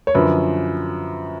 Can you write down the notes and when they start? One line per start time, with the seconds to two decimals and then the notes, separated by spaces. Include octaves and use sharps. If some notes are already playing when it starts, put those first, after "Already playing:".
0.07 C#5
0.14 F#2 D3 F3 B4